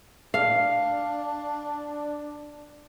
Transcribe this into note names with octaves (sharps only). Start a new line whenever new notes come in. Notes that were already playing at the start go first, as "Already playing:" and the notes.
D4 F5